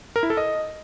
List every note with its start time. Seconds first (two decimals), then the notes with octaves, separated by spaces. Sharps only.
0.16 A#4
0.23 E4
0.30 A4
0.37 D#5